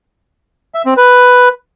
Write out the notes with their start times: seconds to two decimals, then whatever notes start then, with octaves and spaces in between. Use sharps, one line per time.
0.75 E5
0.86 C4
0.97 B4